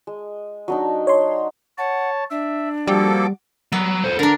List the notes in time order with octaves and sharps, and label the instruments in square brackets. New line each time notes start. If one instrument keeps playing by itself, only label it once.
[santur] G#3
F#3 D4 D#4
[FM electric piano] C#5 C6
[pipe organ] C#5 A5 [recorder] F#5
[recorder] D4 [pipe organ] E5
[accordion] F3 A#3 A4 [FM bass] G3 [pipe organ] F#4 D6
[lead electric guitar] F#3 [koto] B3
[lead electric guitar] A4 C5
[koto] D3 D4 [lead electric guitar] A#4 A#5